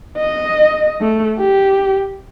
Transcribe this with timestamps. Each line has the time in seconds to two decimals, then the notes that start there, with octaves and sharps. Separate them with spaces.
0.18 D#5
1.01 A3
1.39 G4